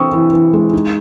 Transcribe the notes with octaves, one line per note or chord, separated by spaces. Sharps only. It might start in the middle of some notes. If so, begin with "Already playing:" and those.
Already playing: E3 C4 E4 C#6 D#6 E6
E3
E3
G#3
D#4